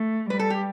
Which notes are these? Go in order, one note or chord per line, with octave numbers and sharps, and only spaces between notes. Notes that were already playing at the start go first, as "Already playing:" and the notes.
Already playing: A3
G3 B4
A4
G4